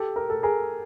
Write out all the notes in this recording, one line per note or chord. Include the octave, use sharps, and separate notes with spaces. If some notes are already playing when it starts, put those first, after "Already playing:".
Already playing: G4 A4
A#4
A4
G#4 A#4